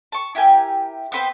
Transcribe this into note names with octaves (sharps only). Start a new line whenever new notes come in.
A5 C#6
E4 G4 A#4 G#5
B3 C4 B4 C5